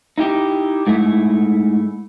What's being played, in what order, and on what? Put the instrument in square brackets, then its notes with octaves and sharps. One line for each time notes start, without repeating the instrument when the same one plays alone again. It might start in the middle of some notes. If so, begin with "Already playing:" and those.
[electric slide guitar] D#4 E4 G4
G#2 A3 E4